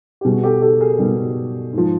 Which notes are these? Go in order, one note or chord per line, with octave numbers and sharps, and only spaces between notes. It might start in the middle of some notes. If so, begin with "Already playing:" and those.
G4
B2 G3 F#4 G#4
G4 A4
G4 A4
G#4 A#4
B2 G3
G#2 F3